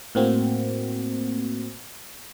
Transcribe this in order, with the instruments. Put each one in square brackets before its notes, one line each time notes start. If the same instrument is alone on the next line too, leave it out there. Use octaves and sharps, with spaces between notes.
[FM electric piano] A2 A#3 C4 F#4